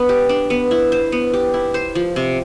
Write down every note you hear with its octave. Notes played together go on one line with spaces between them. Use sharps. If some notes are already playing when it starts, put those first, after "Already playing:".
Already playing: B3 D4
G4
D4
B3
E4
C5
B3
G4
E4
C5
F3
C3